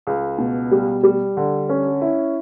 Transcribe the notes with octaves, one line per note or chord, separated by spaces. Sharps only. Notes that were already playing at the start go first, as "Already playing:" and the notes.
C#2
B2
G3
G3
D3
C#4
E4